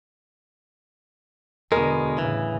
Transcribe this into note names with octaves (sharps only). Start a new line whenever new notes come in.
E2 B2 D3 G#3 A#4
A2 C#3 E3